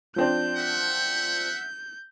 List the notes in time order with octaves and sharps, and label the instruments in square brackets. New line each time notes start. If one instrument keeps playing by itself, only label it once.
[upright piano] F3 C4 D4 [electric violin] G6
[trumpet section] E5 F#5